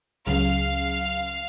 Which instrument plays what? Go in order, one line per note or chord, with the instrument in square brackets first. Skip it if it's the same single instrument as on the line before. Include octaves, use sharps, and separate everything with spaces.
[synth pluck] C#2 C#3 F#3 C#4 G#4 [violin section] F5 F6